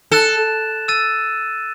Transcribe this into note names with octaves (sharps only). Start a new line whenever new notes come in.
A4 F#6 A6 E7
E6 A6 D#7